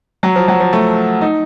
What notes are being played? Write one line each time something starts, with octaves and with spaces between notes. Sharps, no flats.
F#3
F3
F#3
F3
A3
D#4